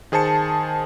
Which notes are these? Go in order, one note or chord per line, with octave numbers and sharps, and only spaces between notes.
D#3 G#4 C5 A5 C#7